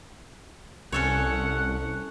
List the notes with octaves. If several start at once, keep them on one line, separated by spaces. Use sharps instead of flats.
C2 C#4 A4 C#5 F#5